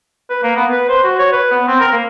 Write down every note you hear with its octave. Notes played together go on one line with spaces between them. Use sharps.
B4
A#3
B3
B4
C5
F#4
C#5
B4
B3
C4
A#4
A#3